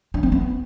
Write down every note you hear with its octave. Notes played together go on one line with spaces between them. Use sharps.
D4
C4
B3